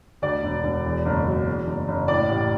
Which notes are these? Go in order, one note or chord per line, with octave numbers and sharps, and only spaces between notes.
D2 D5
E1
E1
E2
F#1
F#3
E2
F#1
F#1
A2 D5
A1